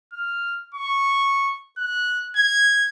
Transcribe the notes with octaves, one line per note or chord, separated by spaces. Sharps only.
F6
C#6
F#6
G#6